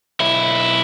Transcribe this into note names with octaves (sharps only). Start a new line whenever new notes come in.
B1 E4